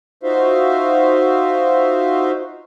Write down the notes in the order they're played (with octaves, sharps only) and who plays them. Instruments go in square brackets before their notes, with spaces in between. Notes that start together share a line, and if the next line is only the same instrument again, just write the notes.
[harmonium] D#4 F4 F#4 C5 E5 F5